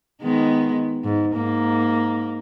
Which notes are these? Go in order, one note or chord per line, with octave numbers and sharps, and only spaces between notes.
D#3 G#3 B3
G#2
G#2 A#3